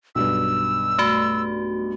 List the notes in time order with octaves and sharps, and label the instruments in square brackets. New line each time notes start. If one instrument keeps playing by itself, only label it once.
[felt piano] B1 G2 [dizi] E6
[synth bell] A3 F#4